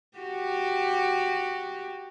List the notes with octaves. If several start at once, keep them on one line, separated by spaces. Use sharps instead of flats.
F#4 G4